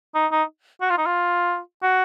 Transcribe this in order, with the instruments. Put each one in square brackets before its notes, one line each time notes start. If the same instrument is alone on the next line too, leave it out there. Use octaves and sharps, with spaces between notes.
[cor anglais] D#4
D#4
F#4
F4
D#4
F4
F#4